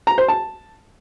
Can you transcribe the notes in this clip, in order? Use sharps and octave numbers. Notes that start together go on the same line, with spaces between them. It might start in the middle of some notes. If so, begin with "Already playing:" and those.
A#5
C5
A5